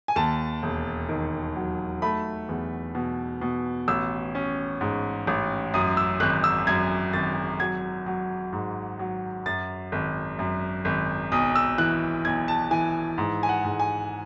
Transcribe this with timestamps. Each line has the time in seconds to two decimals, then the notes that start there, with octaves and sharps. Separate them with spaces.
0.08 G#5
0.16 D#2 A5
0.62 E1
1.09 D#3
1.56 F#3
2.02 A3 B5
2.49 E2
2.95 B2
3.41 B2
3.88 A1 E6
4.35 C#4
4.81 G#2
5.27 A1
5.74 F#2 D#6
5.97 E6
6.20 G#1 F#6
6.44 E6
6.67 F#2 G#6
7.13 G#1 A6
7.60 F#3 G#6
8.06 F#3
8.53 G#2
8.99 F#3
9.46 F#2 A6
9.92 G#1
10.39 F#2
10.85 G#1
11.32 B1 D#6
11.55 E6
11.78 E3 F#6
12.25 B1 G#6
12.48 A5
12.71 E3 G#5
13.18 G#2
13.43 G#5
13.49 F#5
13.64 G#2
13.80 G#5